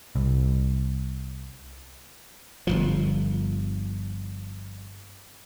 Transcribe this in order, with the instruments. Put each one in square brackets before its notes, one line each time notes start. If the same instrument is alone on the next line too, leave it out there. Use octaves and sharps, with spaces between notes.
[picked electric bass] C2
[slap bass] G1 C2 F3